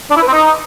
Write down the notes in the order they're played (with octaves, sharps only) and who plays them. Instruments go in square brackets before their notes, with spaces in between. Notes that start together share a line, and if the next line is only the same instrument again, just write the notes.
[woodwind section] D4
E4
B4
C4
D#4